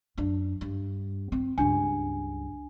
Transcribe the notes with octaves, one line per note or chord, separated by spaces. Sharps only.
F#2 D4
G2
C4
C#2 G2 D4 G#5